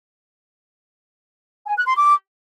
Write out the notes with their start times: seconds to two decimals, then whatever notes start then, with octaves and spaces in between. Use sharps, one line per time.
1.66 G#5
1.76 F#6
1.86 C6
1.96 D6